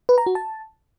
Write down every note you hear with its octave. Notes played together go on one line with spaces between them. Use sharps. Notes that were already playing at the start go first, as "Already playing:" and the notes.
B4
A#5
F#4
A5